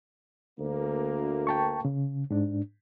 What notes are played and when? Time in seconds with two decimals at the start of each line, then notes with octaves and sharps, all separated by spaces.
0.60 D2 A#3
1.47 G5 A5 C#6
1.85 C#3
2.30 G#2 D4